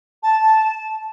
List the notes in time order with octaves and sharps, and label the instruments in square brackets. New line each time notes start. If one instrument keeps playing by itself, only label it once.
[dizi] A5